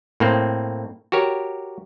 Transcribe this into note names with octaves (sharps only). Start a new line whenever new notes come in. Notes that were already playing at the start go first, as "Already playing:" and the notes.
A2 A#3 C4
F#4 G4 A#4 C#5